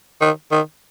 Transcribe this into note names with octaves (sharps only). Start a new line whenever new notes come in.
D#3
D#3